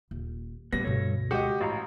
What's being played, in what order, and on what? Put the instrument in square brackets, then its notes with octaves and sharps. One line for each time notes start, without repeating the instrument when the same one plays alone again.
[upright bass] D#1
[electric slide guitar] A#2 G3 B3 [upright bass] C#4 [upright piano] A#6
[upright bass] D2 B2 [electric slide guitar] G2 A4 C#5
[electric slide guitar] G#3 F#4 F#5 [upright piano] G4 D#5
[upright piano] A1 [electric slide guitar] F#4 F5 A#5